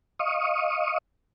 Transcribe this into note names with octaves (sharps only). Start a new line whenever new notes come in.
D#5 F5 C#6 D#6